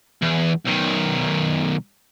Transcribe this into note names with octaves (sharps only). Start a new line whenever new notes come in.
E2
B1 D#3